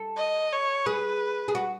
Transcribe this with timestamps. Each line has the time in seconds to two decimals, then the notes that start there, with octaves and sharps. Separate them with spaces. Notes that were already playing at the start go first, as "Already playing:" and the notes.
Already playing: A4
0.17 D#5
0.53 C#5
0.86 G#4 B4
1.48 G#4
1.55 F#4